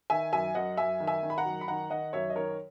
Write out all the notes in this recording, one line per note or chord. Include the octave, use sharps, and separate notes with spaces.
D#3 E5 G#5
F#2 E5 G#5
F#2 D#5 F#5
F#2 E5 G#5
D#3
E5 G#5
D#3
B5
F#5 A#5
F#2
B5
D#3 F#5 A#5
D#3 D#5 F#5
F#2 C#5 E5
D#5
D#3 A#4 C#5